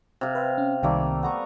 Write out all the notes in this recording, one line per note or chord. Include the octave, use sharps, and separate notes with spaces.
C3 F5
B4 C5 E5
C#4
C2 C3 D#3 G3 A3 A#3
B3 A#5 C#6